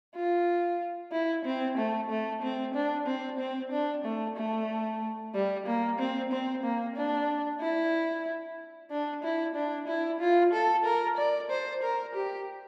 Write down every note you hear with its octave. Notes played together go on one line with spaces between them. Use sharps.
F4
E4
C4
A3
A3
C4
D4
C4
C4
D4
A3
A3
G3
A#3
C4
C4
A#3
D4
E4
D4
E4
D4
E4
F4
A4
A#4
D5
C5
A#4
G4